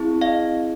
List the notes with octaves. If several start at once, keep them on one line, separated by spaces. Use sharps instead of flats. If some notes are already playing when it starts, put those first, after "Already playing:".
Already playing: C4 E4 G#4
D#5 F5